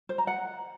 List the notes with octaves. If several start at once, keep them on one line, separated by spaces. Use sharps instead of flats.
C5
A#5
F#5